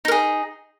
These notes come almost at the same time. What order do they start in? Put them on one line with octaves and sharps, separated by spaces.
D#4 A#4 G#4